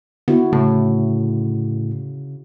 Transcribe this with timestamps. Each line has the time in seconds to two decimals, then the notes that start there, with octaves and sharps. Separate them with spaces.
0.28 D3 B3 E4 F#4
0.53 A2 C#3